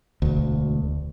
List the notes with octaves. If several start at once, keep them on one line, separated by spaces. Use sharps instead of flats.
E1 D2